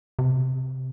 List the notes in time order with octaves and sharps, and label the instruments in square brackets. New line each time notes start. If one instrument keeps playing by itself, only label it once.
[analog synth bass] C3